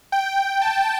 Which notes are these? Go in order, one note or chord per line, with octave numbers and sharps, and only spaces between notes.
G5
A5